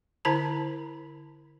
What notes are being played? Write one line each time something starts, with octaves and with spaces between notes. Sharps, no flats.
D3 E4 A#4 C5 A5 A#5